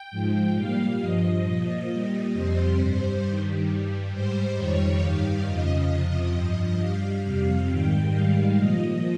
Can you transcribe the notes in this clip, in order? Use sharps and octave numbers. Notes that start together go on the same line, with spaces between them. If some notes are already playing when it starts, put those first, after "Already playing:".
Already playing: G5
G#2 F3
A#2 G3 F5
G2 F3 D#5
A#2 F3
A#2 G3
F2 C3 G3 C5
G2 G3
G2 D#3 G3
G2 G3
G#2 G3 C5
F2 D#3 G3 C#5
G2 D#3 G3 F5
F2 C#3 F3 D#5
F2 C3 F3
G2 F3
G2 G3 F5
F2 C3 G3
G#2 D#3 G3 G5
G#2 D#3 G3 F5
A#2 F3 D#5